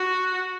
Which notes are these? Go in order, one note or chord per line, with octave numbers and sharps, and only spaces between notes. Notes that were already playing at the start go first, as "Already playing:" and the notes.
Already playing: F#4